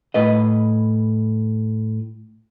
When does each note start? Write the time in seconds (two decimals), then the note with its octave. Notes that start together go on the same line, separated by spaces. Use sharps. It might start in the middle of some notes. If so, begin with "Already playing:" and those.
0.14 A2 B4 D#5